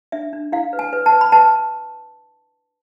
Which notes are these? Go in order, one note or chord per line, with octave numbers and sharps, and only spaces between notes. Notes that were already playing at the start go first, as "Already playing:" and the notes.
D4 E5
D4
E4 F5
B4
G#5
B4
A5
B4
B5
B4 A5